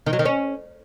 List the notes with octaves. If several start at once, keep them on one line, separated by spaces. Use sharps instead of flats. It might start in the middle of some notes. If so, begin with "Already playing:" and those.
D#3
F#3
D#3
C#4